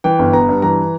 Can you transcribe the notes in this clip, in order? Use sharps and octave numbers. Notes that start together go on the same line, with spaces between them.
E3 G5
G1
B3 A#5
G2
E3 A#5